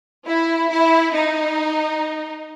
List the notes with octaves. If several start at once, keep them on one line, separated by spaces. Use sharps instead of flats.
E4
E4
D#4